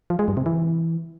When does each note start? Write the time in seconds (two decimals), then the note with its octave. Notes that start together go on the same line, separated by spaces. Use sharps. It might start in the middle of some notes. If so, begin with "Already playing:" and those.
0.10 F3
0.19 G#3
0.28 G2
0.37 C3
0.46 E3